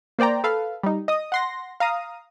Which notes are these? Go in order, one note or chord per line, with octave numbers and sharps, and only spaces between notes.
A#3 C5 D5 G5 A#5
A4 B4 F5
G3 D#4
D#5 D#6
F#5 C6 A#6
F5 A#5 D#6